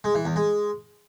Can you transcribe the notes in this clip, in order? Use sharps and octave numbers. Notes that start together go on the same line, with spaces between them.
G#3
E3
E2
G#3